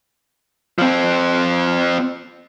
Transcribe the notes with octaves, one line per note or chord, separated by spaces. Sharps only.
F3 C4